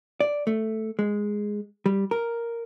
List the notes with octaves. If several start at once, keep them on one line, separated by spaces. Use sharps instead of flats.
D5
A3
G#3
G3
A#4